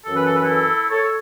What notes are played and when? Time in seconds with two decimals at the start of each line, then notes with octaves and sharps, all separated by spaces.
0.05 F#2 E3 C#4 A4
0.16 B4
0.25 A4
0.35 B4
0.44 E4 A4
0.89 A4 C#5